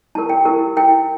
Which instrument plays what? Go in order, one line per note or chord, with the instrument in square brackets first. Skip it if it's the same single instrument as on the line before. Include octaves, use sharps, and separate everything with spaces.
[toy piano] E4 G4 A#4 A5
G5
E4 G4 A#4
E4 A#4 G5